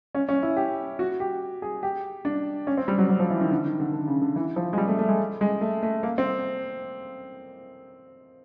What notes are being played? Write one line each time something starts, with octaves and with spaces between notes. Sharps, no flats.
C#4
C#4
E4
G4
F#4
G4
G#4
G4
D4
C#4
C4
G3
F#3
F#3
F3
E3
D#3
D3
D#3
D3
D3
C#3
D3
E3
F3
G#3
G3
A3
A3
G#3
G#3
A3
A3
A#3
C4